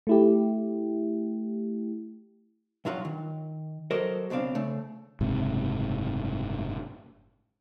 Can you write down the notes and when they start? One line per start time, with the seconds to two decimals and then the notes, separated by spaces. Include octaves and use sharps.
0.07 A3 E4 G4
2.85 B1 G2 F#3 F4 F#4
3.05 D#3
3.91 F#3 A4 A#4 C5 D#5
4.30 C#2 B2 C4 D4 F5
4.55 C#3 A3
5.21 F#1 G#2 C3